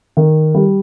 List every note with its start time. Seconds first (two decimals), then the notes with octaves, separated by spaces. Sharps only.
0.17 D#3
0.55 G3